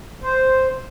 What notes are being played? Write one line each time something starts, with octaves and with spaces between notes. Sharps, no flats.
C5